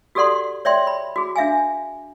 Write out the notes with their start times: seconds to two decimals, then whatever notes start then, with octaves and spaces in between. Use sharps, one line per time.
0.15 F#4 G4 A4 D5 F#5 C6
0.65 C#5 D5 E5 G5 C6
0.87 B5
1.16 F#4 G#4
1.36 D4 E5 F5 G#5